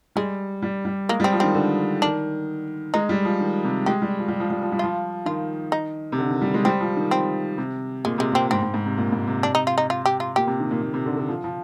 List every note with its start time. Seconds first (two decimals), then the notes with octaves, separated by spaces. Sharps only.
0.16 G3 G#3
0.62 G3
0.85 G3
1.09 G#3 A#3
1.20 G3 C4
1.33 F3
1.40 D#3 C4
1.55 D3
2.02 D#3 D4
2.94 G#3 D#4
3.09 G3
3.25 F3
3.40 D#3
3.64 C3
3.86 G#3 G4
4.02 G3
4.18 F3
4.28 G3
4.40 F3
4.50 G3
4.62 F3
4.72 G3
4.79 F3 F4
5.26 D#3 F4
5.72 D#4
6.12 C3
6.18 D3
6.30 D#3
6.41 G3
6.54 G#3
6.65 G3 C4
6.81 F3
6.97 D#3
7.11 C4
7.58 C3
8.05 A#2 G#3
8.18 C3 G#3
8.32 A#2 C4
8.51 G#2 C4
8.62 G#2
8.74 G#2
8.86 C3
8.97 A#2
9.12 G#2
9.27 C3
9.43 D4
9.55 D#4
9.67 F4
9.78 D#4
9.90 F4
10.05 G4
10.20 F4
10.36 A#2 G4
10.47 C3
10.60 D#3
10.71 A#2
10.82 A#2
10.94 C3
11.06 D3
11.17 D3
11.29 F3
11.44 F3